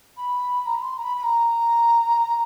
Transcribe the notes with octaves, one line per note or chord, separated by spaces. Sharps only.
B5
A#5
B5
C6
A#5
B5
B5
A#5